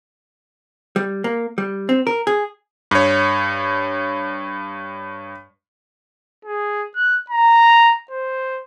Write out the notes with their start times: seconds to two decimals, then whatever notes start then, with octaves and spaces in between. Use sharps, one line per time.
0.96 G3
1.24 A#3
1.58 G3
1.89 C4
2.07 A#4
2.27 G#4
2.91 G2 C#5
6.45 G#4
6.96 F#6
7.30 A#5
8.11 C5